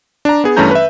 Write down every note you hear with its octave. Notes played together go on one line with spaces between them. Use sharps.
D4 A#5
B3 G#4
G2 E3 A3 C#4 A#5 G6
B4 E5